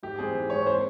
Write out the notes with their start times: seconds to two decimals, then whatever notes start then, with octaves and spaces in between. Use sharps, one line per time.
0.03 G#2 G4
0.19 E3 G#3 C4 G#4
0.34 G#2
0.50 E3 G#3 C4 C#5
0.66 C5